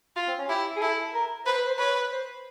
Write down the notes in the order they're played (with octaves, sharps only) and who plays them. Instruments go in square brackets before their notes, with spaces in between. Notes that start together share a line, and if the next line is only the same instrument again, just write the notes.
[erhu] F4
[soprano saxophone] C4
C#4
[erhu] E4 [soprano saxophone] G4
[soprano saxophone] G#4
[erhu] E4 [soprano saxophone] A4
[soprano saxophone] A#4
[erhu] B4 [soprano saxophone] C5
[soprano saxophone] B4
C5
[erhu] B4 [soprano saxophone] C#5
[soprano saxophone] C5